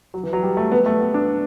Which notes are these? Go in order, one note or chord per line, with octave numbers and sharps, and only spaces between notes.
F#3
E3
F#3
G3
A3
B3
A3
B3
D4